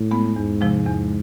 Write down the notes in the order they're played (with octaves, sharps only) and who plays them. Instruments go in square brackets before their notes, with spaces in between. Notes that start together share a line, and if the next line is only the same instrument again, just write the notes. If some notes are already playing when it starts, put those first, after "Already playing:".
Already playing: [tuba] A2
[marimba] G#3 B3
[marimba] E2 [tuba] G#2
[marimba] C3 F3 G#3
E2